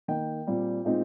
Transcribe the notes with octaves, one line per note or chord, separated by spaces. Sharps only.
D#3 A#3 D#4 G5
A#2 G3 C4
A#2 G#3 C4 D#4